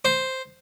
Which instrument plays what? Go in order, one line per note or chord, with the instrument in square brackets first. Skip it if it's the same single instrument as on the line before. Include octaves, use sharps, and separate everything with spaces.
[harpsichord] C5